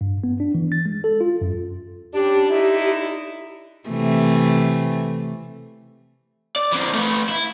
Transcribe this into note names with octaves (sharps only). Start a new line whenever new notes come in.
G2
B3
D4
E3
A6
G#3
A4
F4
F#2
G3 C#4 D4 G4
D3 D#4 E4
C3 E3 A3
D5
E3 C4
A3 B4
E4